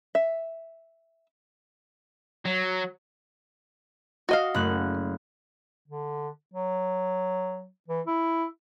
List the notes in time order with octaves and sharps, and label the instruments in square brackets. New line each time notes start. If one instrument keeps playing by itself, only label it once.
[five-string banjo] E5
[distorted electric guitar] F#3
[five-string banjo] F#4 D#5 F5
[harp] F#1 A3 F#6
[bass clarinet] D3
F#3
E3
E4